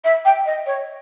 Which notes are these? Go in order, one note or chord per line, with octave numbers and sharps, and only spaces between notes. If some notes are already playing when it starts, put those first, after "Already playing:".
E5
G5
D#5
C#5